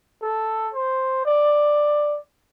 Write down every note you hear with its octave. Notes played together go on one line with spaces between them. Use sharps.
A4
C5
D5